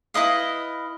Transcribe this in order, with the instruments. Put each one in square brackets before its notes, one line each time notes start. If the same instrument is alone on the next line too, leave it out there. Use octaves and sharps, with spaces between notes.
[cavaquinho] E4 B4 D#5 F5